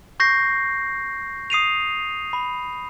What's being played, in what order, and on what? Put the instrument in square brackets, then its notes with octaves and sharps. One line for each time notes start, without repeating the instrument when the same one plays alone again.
[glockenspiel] C#6 G6 A#6 C7
D#6 C7 D#7 F7
B5